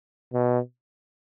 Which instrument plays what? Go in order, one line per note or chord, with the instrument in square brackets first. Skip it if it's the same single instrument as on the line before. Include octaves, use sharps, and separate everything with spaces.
[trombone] B2